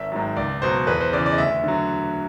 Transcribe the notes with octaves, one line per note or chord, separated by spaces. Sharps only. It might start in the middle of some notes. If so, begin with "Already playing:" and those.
Already playing: G#1 E5
G#2 D#3 F#3
C#2 D5
B2 F#3 C5
E2 B4
C5
C#3 E3 D5
D5
D#5
D2 E5
D3 F#3